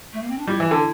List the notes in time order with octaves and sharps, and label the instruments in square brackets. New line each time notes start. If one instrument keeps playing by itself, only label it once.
[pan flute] A3
A#3
C4
D4
[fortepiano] G3 [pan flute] E4
[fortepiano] E3
D3